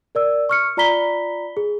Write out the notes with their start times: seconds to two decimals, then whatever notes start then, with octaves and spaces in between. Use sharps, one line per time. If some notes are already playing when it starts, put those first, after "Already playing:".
0.15 A#4 D5 E6
0.49 C#6 F6 C#7
0.77 F4 D5 A#5 B5 B6 G7
1.57 G#4